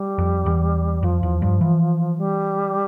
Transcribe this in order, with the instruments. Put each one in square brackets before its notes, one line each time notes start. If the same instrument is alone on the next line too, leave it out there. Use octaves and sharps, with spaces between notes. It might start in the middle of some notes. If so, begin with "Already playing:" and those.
Already playing: [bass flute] G3
[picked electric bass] F2
E2
[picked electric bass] F2 [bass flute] F3
[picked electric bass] E2
G2
E3
[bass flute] G3